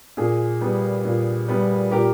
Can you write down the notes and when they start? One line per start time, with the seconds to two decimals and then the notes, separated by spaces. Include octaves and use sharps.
0.17 A#2 G#4
0.61 G3 B3
1.05 A#2
1.48 G3 B3
1.91 A#2 G4 A#4